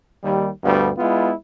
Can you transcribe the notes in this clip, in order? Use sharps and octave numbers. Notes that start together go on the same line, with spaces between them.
D#2 G3
D2 G2 G3 B3
G#3 B3 E4 F4